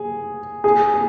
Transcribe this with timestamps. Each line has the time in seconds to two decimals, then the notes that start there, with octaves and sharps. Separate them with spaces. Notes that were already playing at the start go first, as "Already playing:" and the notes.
Already playing: G#4
0.64 G#4
0.94 G#4